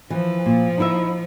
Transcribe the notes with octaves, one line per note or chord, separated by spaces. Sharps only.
E3 F3
A#2
D#4 E4 E5